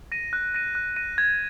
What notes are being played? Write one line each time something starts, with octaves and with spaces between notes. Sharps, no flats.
A#6 D#7
F#6
A#6 D#7
F#6
A#6 D#7
G#6